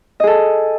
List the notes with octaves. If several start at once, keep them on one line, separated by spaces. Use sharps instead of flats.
G#4 A4 D#5